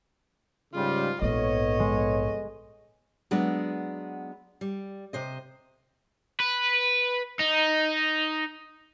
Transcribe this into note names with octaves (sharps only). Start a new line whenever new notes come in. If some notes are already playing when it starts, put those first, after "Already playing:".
G#2 C#3 G3 F4
A#1 G#2 B3 A4 C#5 D#5
G#3
F#3 G#3 B3 D4
G3
C3 C5 D#5
B4
D#4